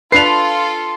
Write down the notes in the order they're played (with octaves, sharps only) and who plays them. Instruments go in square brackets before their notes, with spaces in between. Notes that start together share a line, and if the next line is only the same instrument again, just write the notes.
[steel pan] D4 B4 [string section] F4 A4 [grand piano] C7 F7